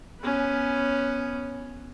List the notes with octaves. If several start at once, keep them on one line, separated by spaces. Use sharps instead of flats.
B3 C#4